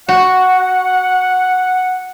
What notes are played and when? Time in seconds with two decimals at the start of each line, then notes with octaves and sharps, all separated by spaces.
0.09 F#4 F#5